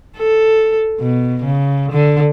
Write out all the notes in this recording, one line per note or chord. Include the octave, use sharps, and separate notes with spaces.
A4
B2
C#3
D3